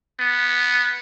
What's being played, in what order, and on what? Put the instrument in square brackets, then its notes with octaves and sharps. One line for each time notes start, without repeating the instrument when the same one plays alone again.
[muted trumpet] B3